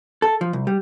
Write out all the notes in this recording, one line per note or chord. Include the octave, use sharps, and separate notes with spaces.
A4
F3
C2
G3